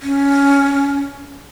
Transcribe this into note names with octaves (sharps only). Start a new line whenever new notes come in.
C#4